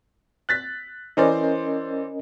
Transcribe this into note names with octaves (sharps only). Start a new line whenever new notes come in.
F#6 A6 B6
E3 C#4 A#4 C5 D5 D#5